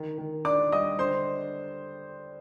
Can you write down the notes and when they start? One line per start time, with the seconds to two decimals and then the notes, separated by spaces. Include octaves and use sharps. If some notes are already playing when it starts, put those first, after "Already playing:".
Already playing: D#3
0.18 D#3
0.45 D4 D5 D6
0.72 G3 D#5 D#6
0.99 D3 C5 C6